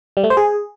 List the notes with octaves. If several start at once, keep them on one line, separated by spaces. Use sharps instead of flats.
G3
A3
C5
G#4